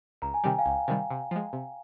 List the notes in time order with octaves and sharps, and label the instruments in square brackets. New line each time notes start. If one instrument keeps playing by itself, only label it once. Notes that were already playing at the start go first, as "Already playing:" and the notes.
[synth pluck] C#2 [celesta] A#5
[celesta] G#5
[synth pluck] C3 D#3 G3 [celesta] G5
[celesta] F5 G#5
[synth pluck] C#2
C3 D#3 G3
C3
F3 G#3
C3